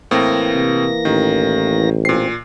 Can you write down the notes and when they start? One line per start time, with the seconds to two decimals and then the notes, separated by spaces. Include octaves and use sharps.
0.11 A2 E3 A#3 C4 A#6
0.53 C3
1.05 A1 D#3
2.05 A#2 C4 C7